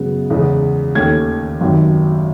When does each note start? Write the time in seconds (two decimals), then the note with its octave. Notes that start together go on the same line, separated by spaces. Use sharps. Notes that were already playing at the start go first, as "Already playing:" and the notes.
Already playing: F#2 C#3 G#3 B3
0.30 E2 C#3 G#3 B3
0.95 D#2 D#3 A3 C#4 G#6
1.61 G#1 F#2 D#3